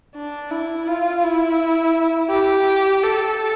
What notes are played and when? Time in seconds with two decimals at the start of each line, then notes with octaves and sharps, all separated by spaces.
0.15 D4
0.50 E4
0.87 F4
1.23 E4
2.30 G4
3.03 A4